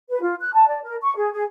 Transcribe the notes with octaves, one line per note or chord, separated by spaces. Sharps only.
B4
F4
F#6
A5
D5
A#4
C#6
G#4
G#4